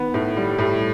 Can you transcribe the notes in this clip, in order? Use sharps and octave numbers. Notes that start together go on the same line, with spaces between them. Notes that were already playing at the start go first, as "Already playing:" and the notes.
Already playing: D#3 B3
A2
G3
A2